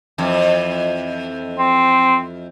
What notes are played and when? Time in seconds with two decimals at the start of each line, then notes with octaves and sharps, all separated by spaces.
0.18 F2 E3
1.59 C4